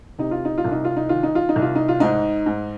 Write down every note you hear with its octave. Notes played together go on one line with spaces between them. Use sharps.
C3 D#4
F4
D#4
F4
C2
D#4
F4
D#4
D#3 F4
D#4
F4
D#4
C2
F4
D#4
F4
G#2 D#4
G#2